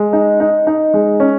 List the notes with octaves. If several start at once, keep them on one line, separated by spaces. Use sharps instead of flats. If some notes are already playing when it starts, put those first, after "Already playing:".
Already playing: G#3
D#4
D#4
D#4
G#3
C#4